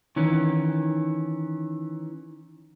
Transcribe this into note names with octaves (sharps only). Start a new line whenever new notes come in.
D#3 E3 C#4